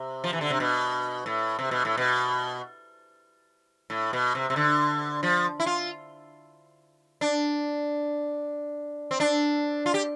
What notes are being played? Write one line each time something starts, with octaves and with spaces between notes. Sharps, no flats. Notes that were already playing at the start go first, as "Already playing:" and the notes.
Already playing: C3
F3
E3
D3
C3
B2
A2
C3
B2
A2
B2
A2
B2
C3
C3
D3
F3
E4
F4
D4
C4
D4
F4
G4